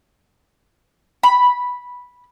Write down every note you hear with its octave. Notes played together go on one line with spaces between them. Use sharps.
B5